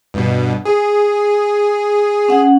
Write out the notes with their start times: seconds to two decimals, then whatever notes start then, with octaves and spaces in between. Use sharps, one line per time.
0.14 G2 B2
0.65 G#4
2.28 C#4 F#5